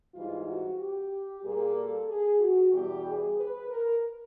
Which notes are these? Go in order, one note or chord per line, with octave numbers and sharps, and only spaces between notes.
G#2 E3 G3 F4
F#4
G4
A#2 G3 A#3 G#4
A4
G#4
F#4
E2 B2 G3 G4
G#4
B4
A#4